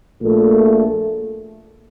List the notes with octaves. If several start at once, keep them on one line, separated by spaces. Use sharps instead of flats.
A#1 A#2 A3